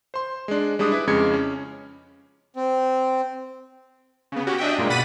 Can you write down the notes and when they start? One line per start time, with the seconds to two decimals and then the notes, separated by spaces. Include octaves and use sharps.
0.14 C5 C6
0.48 G#3 D4
0.79 G3 G#3 D4 D6 D#6
0.92 E4 B4
1.07 F2 C#3 G#3 D6 G#6 C#7
1.34 C#4
2.55 C4
4.32 C#3 B3
4.47 C#4 F#4 G4
4.58 D4 D#5 E5 G5
4.78 G2 A#2 G#3 A#3
4.90 B2 F#5 B5 A6 B6 D#7